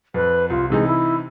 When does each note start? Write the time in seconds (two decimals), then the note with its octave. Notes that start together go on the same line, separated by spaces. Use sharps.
0.14 F2 B4
0.50 C2 F4
0.70 C3 E3 G#3 D#4
0.87 E4